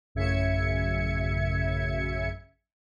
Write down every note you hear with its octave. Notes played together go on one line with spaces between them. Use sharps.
A1 F#2 C#3 E5 G#6 C#7